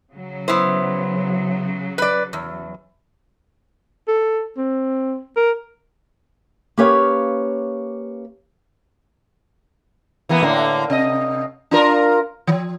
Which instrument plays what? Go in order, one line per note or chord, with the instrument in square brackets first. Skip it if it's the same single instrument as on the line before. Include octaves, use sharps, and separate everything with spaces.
[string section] C#3 F#3
[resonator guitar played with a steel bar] B3 E4 C5
B4 D5
E2
[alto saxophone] A4
C4
A#4
[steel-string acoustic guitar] A#3 C#4 G4 B4 C#5 F5
[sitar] E3 A#3 B3
A2 D3 A#3
C3 D#5
D4 F4 A#4
E3 F3